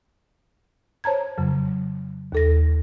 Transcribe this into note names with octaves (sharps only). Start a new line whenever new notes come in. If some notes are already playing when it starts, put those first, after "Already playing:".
C5 C#5 A5 A#5 G#6
F2 C#3 F#3
D#2 A4 A#6